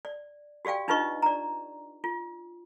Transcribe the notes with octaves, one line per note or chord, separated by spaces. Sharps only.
D5
F#4 G4 D5 F5 G5
D4 D#4 F4 B4 D#5 C#6
D5 A#5
F4